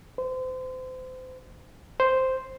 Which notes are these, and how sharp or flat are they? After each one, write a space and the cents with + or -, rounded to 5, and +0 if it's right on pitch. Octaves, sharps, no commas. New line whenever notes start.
C5 -35
C5 -5